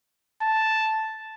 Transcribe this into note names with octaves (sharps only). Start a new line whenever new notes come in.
A5